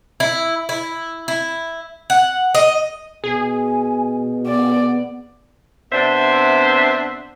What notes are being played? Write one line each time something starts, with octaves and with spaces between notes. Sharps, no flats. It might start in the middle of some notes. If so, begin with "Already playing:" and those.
E4
E4
E4
F#5
D#5
B2 G#4 G#5
B3 D5
C3 B3 D4 C5 E5